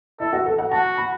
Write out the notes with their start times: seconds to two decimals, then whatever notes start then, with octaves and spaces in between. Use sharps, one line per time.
0.19 E4 A4
0.33 F#4
0.46 A4
0.58 F#5
0.71 F#4 A5
0.97 B5